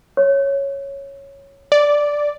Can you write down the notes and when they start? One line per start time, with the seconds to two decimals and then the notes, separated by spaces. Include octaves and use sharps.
0.17 C#5
1.72 D5